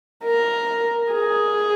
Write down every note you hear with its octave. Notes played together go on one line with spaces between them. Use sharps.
A#4
G#4